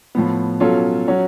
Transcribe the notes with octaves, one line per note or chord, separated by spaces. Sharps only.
A2 F3 B3
B2 F#3 C#4 F4 A4
F#3 C#4 F#4